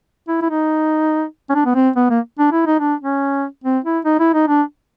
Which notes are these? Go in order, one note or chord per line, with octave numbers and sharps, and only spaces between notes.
E4
E4
D#4
C#4
D4
B3
C4
B3
A#3
D4
E4
D#4
D4
C#4
C4
E4
D#4
E4
D#4
D4